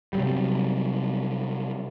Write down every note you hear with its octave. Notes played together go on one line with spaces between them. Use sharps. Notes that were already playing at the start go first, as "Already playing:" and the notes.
C3 F#3 G3